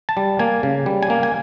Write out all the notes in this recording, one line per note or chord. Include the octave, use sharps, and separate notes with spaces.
A5
G3
A#3 G#5
C#3
G3
G#5
A#3
G#5